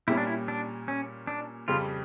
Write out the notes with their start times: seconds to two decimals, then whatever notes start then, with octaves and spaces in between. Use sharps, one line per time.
0.07 A#2 G3 C#4 E4
0.17 D4
0.27 E4
0.48 D4
0.88 C#4
1.27 D4
1.68 F2 C#3 G3 F4